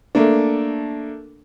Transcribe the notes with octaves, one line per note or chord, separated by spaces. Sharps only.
A3 A#3 D4